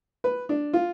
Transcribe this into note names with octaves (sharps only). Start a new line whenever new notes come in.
B4
D4
F4